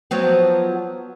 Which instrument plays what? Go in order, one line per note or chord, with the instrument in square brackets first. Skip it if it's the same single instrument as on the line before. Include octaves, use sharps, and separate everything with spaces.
[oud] F3 F#3 B3